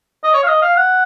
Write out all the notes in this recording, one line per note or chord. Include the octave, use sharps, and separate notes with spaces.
D#5
C#5
F5
D#5
F5
F#5